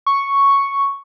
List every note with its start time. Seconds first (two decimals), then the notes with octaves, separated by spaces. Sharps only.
0.06 C#6